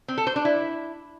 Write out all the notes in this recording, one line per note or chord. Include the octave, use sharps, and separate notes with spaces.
C4
A4
C5
D4
E4